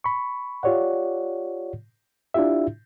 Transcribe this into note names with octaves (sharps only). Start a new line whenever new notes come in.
B5 C#6
F4 G4 C#5 D5 F#5
D4 E4 F4 G4 E5